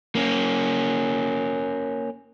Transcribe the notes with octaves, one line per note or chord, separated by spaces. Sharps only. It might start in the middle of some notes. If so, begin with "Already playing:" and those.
A#3 C#4